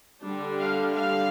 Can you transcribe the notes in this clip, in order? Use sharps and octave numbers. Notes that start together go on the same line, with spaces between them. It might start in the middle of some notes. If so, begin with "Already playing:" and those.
D3 G3 D4
F5
F5